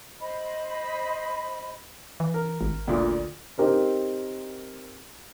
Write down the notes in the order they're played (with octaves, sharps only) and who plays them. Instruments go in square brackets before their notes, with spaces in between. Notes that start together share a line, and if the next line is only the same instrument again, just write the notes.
[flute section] C5 D#5 B5
[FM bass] E3
[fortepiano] A#4
[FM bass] G#1
[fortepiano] D2 A#2
[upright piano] C4 D#4 G4 A#4 C5